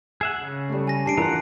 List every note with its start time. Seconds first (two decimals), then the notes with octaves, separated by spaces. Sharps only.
0.21 G#4 E5 F#5
0.41 C#3
0.69 G3 A3
0.87 G#5 A#6
1.06 G2 G3 A5 C7 D7
1.18 E3 F4 G4 A#4 F#5 A#5